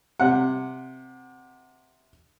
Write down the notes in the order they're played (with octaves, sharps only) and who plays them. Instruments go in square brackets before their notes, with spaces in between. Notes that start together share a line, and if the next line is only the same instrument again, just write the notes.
[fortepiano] C3 F#5